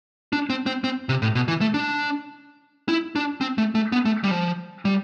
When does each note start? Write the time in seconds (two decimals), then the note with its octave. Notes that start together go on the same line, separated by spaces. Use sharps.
0.33 D4
0.50 C4
0.66 C4
0.84 C4
1.09 C3
1.22 A2
1.35 B2
1.48 E3
1.61 A3
1.74 D4
2.89 E4
3.16 D4
3.41 C4
3.58 A3
3.75 A3
3.92 B3
4.05 A3
4.24 G3
4.31 F3
4.85 G3